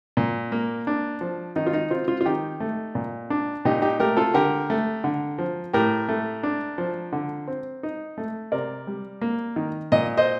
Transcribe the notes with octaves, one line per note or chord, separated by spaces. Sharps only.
A#2
A#3
D4
F3
D#3 D#4
F4
D#4
C4 F4
F4
F4
D#3 D#4 G4
A3
A#2
D4
A#2 D#4 G4
D#4 G4
A3 G4 A#4
F4 A4
D3 G4 A#4
A3
D3
F3
A2 G4 A#4
A3
D4
F3
D3
C4
D#4
A3
C3 A#4 D5
G3
A#3
D#3
A#2 D#5
C5 D#5